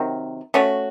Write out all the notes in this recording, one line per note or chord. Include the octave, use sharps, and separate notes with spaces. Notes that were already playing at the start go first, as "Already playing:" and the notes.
Already playing: C3 D#3 F#3
A3 C#4 F#4